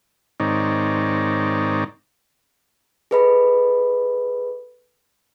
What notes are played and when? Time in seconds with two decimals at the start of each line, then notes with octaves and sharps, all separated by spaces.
0.40 G#2 D#3 C4 D#4 C#5 D5
3.11 G#4 A4 B4 D#5 B5